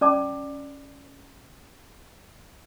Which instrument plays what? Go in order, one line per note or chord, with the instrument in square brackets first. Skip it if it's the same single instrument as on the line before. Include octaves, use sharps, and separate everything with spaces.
[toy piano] C#4 D5 A5 D6